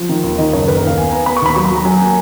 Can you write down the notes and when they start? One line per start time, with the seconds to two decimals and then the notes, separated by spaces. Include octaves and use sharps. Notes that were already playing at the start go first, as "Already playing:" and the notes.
Already playing: F3
0.09 D#3
0.24 D#2
0.38 D#3 D#5
0.53 F#1 C#5
0.68 D#2 B4
0.77 A#4
0.82 D#2
0.87 F5
0.97 B3 G#5
1.11 B3 A#5
1.26 B3 B5
1.37 C#6
1.42 D#2 B5
1.55 F#3 C#6
1.65 B5
1.71 F#3 A#5
1.85 F#3 G#5
2.01 A#3